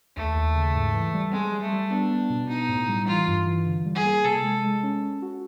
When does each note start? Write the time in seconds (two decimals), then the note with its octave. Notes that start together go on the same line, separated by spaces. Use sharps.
0.16 D#2 A3
0.35 D#2
0.55 C#3
0.74 G#2
0.93 E3
1.14 G3
1.33 G#3 C4
1.52 G3
1.62 A3
1.72 G3
1.91 B3 D4
2.11 B3
2.30 B2
2.49 B3 D#4
2.69 A2
2.88 G3
3.08 E3 F4
3.28 G2
3.46 E3
3.66 D3
3.85 G3
3.95 G#4
4.05 A#3
4.24 C3 A4
4.43 G#3
4.63 G#3
4.83 C#4
5.03 C#4
5.22 F#4